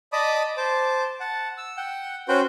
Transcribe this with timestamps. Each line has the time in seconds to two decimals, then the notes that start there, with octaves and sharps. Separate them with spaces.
0.12 D5 D#5 A5 B5 D6 D#6
0.57 C5 A5 D6
1.20 F#5 A5
1.57 E6
1.77 F#5 G5
2.28 C#4 F#4 B4 C5 G5